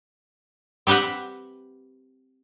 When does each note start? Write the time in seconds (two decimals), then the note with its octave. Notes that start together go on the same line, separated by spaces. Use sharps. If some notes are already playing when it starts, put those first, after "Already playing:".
0.87 C4 G4 B4 E5 F#5